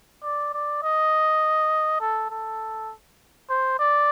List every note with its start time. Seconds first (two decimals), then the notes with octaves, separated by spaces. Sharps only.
0.23 D5
0.53 D5
0.83 D#5
2.00 A4
2.31 A4
3.50 C5
3.79 D5